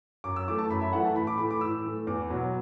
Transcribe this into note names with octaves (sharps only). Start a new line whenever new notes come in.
F#2 D6
E6
E3 A3 D6
A5
F#2 B5
E5
E3 A3 F#5
A5
A2 B5
D6
E3 A3 B5
D6
A2 E6
E3 A3
E2 D6
B2 F#3 B3